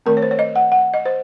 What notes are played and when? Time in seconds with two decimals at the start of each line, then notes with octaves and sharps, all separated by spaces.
0.06 D#3 A3 C4 A#4
0.17 C#5
0.22 C5
0.31 C#5
0.39 D#5
0.56 F#5
0.72 F#5
0.94 D#5
1.06 C5